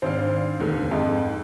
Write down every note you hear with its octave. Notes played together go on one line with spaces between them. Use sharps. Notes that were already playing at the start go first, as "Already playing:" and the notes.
G#1 D4 C5 F5
F1 D#2 D3
F2 G#2